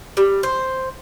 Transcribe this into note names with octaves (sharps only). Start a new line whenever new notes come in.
G3
C5